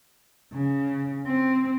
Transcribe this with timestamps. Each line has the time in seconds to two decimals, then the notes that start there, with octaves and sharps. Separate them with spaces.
0.54 C#3
1.27 C4